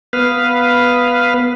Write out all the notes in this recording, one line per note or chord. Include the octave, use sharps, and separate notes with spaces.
B3 B4 F5